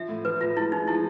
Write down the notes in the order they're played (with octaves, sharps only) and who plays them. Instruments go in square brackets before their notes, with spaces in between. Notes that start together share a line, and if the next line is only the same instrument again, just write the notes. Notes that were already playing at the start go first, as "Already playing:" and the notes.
Already playing: [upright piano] F3 [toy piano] E5
[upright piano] A2
[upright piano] F3 [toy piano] B4
[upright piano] A2 [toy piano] F4
[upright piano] G#3 [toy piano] E4
[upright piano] G#3 [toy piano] D#4
[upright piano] F3 [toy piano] E4